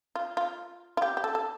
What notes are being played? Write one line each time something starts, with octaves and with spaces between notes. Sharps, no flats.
F4
F4
F4
G4
G4
A4
A4